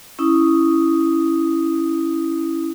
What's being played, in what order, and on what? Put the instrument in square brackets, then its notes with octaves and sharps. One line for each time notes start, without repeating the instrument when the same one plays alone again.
[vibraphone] C#4 E4 D#6